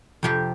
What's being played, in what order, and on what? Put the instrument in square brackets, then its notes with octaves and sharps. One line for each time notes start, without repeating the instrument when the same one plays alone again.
[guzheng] F2 C3 F3 G4